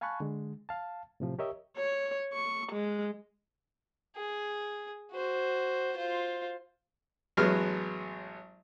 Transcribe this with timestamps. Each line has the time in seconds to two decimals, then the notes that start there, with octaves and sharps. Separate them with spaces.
0.01 F5 G#5 A5 B5 C#6 F#6
0.20 D3 G#3
0.69 F5 A5
1.20 A2 C3 F3
1.39 G4 A#4 C#5 D#5 E5
1.77 C#5
2.33 C#6
2.73 G#3
4.16 G#4
5.12 F#4 C5
5.97 F4 C5
7.37 A1 F#3 G#3 B3 F6